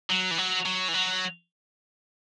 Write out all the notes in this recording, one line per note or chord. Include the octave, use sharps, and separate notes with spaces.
F#3
E3
F#3
F#3
E3
F#3